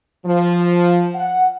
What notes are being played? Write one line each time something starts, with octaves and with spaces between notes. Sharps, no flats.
F3
F#5